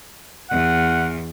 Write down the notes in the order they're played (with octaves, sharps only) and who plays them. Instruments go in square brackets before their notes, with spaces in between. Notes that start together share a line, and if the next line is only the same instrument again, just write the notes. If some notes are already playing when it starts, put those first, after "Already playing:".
[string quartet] E2 [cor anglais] F#5